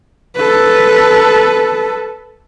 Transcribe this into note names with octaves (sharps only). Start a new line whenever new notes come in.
A4 B4